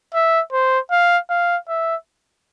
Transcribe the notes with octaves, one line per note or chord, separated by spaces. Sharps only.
E5
C5
F5
F5
E5